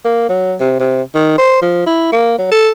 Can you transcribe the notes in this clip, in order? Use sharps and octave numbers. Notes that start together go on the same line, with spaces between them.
A#3
F#3
C3
C3
D#3
C5
F3
E4
A#3
F#3
A4